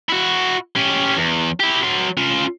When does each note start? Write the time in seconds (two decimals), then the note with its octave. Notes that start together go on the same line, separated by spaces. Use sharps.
0.10 E4 F#4
0.76 C#4 G4
1.17 E2
1.60 E4 G4
1.83 F#3 C6
2.17 C#4 F4